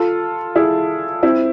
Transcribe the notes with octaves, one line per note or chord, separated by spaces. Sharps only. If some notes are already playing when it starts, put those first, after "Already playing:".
Already playing: F4 A4
E4 G#4
C4 E4